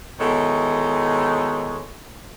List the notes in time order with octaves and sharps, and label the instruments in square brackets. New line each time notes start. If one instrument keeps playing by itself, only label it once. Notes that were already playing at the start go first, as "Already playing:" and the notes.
[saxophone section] B2 D#3 G#3 E4 A4 C#5